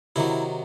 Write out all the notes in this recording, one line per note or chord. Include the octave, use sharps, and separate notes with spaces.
C3 D#3 F#3 E4